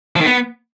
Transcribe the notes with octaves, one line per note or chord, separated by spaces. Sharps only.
F3
D#3
B3